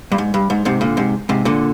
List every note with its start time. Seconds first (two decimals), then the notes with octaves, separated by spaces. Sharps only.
0.12 G2
0.18 G#2
0.34 G2
0.50 G#2
0.65 G#2 C3
0.81 A#2 D3
0.97 G#2 C3
1.29 G#2 C3
1.45 A#2 D3